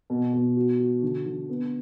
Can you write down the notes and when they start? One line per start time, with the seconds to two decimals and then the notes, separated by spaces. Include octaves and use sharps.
0.10 B2
0.33 B2
0.57 F#4
0.80 F#4
1.03 D3
1.25 D3
1.49 B3